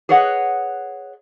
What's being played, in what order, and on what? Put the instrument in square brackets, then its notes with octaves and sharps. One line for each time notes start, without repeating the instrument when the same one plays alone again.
[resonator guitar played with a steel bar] G#4 B4 C#5 D#5 F#5